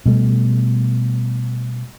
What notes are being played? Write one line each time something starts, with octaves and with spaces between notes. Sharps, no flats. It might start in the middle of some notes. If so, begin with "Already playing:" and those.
B2 G3 A3